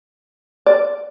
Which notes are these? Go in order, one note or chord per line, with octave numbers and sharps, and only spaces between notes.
D5